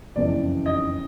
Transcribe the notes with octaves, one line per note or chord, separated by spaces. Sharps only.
F#1 F2 C#3 E3 D5
D#5